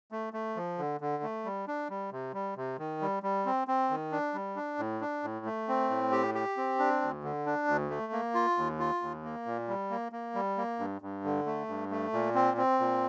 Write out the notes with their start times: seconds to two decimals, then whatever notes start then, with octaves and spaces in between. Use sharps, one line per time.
0.12 A3
0.33 A3
0.56 F3
0.78 D3
1.01 D3
1.23 A3
1.45 G3
1.68 D4
1.90 G3
2.12 C3
2.34 G3
2.56 C3
2.79 D#3
3.01 G3
3.23 G3
3.46 C4
3.68 C4
3.90 D#3
4.12 D4
4.34 G3
4.56 D4
4.79 A2
5.01 D4
5.24 A2
5.46 A3
5.68 C4
5.90 A2
6.12 G4
6.35 G4
6.57 C4
6.79 D4
7.01 D2
7.23 D3
7.46 D4
7.68 D2
7.90 A3
8.12 A#3
8.35 F4
8.57 D#2
8.79 F4
9.01 D#2
9.24 A#3
9.46 A#2
9.68 G3
9.90 A#3
10.12 A#3
10.35 G3
10.57 A#3
10.79 G2
11.02 G2
11.24 D3
11.46 A3
11.68 G2
11.91 A3
12.13 A#2
12.35 C4
12.57 C4
12.80 A#2